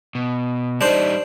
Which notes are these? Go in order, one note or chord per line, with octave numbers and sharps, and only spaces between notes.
B2
G3 D4 D#4 C5